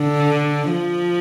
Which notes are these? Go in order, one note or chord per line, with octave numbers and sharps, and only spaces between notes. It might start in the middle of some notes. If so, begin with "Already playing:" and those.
Already playing: D3
F3